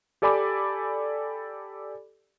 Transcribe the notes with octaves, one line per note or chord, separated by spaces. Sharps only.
G4 A4 D5 G#5 B5 D6